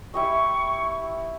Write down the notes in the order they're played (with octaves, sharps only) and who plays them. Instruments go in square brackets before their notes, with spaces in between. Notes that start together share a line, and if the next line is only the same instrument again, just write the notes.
[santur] E4 G4 D#5 [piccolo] C#6